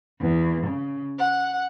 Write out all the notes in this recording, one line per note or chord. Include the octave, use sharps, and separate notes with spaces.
E2
C#3
F#5